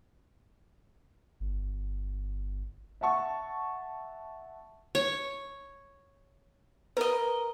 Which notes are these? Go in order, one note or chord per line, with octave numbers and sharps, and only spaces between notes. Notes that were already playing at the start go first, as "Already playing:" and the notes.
G1
E5 F#5 A5 C#6
C#5
A#4 B4 D#5